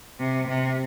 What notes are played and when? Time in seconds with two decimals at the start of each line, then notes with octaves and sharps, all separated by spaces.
0.19 C3
0.48 C3